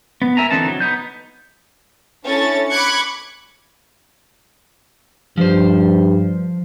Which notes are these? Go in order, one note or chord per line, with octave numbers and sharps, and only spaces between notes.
B3
A#4 E5 G#5 A#5
D3 E3 C4 D#4 A5
F#3
B3 D#4 G6
C#4 D4 E4 A4 A6
B5 C#6 D6 F#6 G#6 C#7
G2 F3 C5